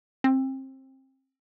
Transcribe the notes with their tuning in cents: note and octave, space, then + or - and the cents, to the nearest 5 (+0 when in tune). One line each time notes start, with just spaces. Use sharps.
C4 +25